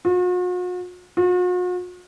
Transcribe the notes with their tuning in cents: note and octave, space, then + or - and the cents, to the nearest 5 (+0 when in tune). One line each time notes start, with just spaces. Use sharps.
F#4 -45
F#4 -45